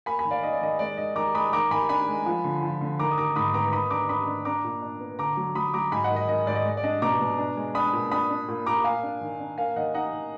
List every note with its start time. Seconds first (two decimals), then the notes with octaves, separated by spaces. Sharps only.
0.06 A#3 G#5 B5
0.19 G#5 B5
0.25 D#3
0.31 D5 F5
0.43 D#3 D#5
0.53 D5
0.61 D#3 D#5
0.79 G#3 D5
0.97 D#3 D#5
1.16 D#3 A#5 D6
1.35 G#3 B5 D#6
1.53 D#3 A#5 D6
1.71 D#3 G#5 B5
1.89 D4 G#5 B5
2.08 G#3
2.26 F3
2.44 D3
2.63 F3
2.81 D3
2.99 D#3 A#5 D6
3.11 D#6
3.17 D#3 A#5 D6
3.36 G#2 B5 D#6
3.54 B3 A#5 D6
3.73 D#3 B5 D#6
3.90 D4 A#5 D6
4.09 D4 B5 D#6
4.27 D4
4.45 D4 A#5 D6
4.64 A#2
4.82 D4
5.00 B3
5.19 D3 A#5 D6
5.37 F#3
5.55 F#3 B5 D#6
5.74 F#3 A#5 D6
5.92 G#2 G#5 B5
6.04 D#5 F#5
6.10 D#3
6.16 D#5
6.28 D#3 D#5
6.47 G#2 D5
6.55 D#5
6.66 G#3
6.77 D5
6.83 D4 D#5
7.02 B2 A#5 D6
7.20 B2
7.38 D4
7.57 G#3
7.75 D4 B5 D#6
7.93 A#2
8.11 D4 B5 D#6
8.30 D4
8.48 A#2
8.66 A#2 A#5 D6
8.84 A#3 F5 G#5
9.03 D4
9.21 D#3
9.40 D4
9.58 A#3 F5 G#5
9.76 D#3 D#5 F#5
9.95 D#4 D#5 F#5
10.13 D#3